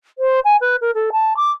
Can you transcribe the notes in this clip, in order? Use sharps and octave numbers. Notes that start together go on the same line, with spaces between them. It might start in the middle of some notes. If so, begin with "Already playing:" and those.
C5
G#5
B4
A#4
A4
A5
D6